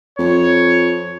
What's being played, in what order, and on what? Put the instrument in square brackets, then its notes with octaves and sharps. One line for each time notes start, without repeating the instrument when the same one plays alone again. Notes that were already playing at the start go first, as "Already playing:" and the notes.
[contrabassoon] F2 [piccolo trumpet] C#5